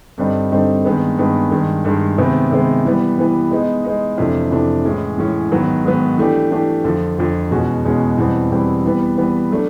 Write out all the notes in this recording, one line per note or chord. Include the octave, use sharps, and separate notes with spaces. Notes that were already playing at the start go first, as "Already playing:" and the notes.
G2 D3 G3 C4 D#4
G2 D3 G3 C4 D#4
G2 D#3 G#3 B3
G2 D#3 G#3 B3
G2 D#3 G#3
G2 D#3 G#3
C3 D#3 G#3 B3
C3 D#3 G#3 B3
E3 G3 B3
E3 G3 B3
G#3 B3 D#4
G#3 B3 D#4
F2 C3 E3 A3 D4
F2 C3 E3 A3 D4
A2 E3 G#3 C#4
A2 E3 G#3 C#4
G#2 D#3 F#3 B3
G#2 D#3 F#3 B3
E3 A3 D4 G4
E3 A3 D4 G4
F2 D3 F3
F2 D3 F3
E2 B2 G#3 C#4 F#4
E2 B2 G#3 C#4 F#4
E2 B2 G3 C4 E4
E2 B2 G3 C4 E4
E3 G3 B3
E3 G3 B3
F#3 A3 D4